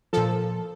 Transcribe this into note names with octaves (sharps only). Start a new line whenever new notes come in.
A#2 F3 A4